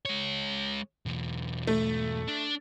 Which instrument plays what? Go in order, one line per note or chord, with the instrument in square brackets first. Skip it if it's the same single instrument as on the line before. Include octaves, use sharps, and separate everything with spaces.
[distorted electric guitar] G#3 C#5
B1 E2
[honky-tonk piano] A3
[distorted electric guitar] D4